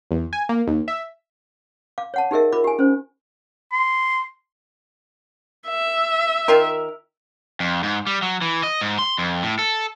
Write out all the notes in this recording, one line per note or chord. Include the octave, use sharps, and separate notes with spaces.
E2
G#5
A#3
D#2
E5
F5 D6
C#5 F#5 A5
D#4 G4 G#4 A#4 D#5 E5
F4 A#4 B5 D6
G4 G#5
C#4 C5
C6
E5
D#3 F4 A#4
F2
G#2
G3
F#3
E3
D#5
G#2
C6
F2
A2
A4